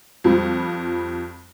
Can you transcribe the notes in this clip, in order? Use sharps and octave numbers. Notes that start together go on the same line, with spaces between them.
F2 F3 G3